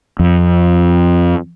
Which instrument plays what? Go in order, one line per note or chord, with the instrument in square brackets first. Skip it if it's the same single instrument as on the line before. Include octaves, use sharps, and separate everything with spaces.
[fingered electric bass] F2